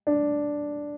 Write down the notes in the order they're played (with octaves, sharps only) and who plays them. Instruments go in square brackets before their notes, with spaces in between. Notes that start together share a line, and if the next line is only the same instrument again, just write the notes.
[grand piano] D4